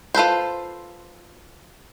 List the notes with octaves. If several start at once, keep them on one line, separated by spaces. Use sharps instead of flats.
F4 A4 B4 C5